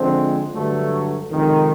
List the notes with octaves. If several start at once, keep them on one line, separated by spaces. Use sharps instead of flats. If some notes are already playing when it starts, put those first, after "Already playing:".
Already playing: D3 F3 G#3 C4
G2 D3 F#3 A3
F2 C3 D#3 G#3